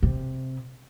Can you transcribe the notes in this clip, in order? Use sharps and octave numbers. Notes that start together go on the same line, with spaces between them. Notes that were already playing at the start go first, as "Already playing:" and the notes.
C3